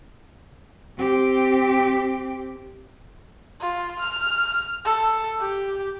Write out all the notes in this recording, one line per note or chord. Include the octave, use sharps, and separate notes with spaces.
C4 G4
F4
F6
A4
G4